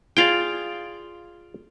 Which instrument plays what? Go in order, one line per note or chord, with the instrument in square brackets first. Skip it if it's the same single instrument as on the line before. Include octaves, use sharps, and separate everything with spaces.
[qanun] F4 G#4 [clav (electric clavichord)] D5 F5 G5